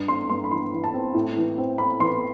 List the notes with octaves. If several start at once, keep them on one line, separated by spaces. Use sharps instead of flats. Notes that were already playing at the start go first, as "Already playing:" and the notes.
Already playing: G2
C4 C6
G2 C6
B5
E3 C6
E3
A5
C4
A2
E3
C4
C4 B5
E3 C6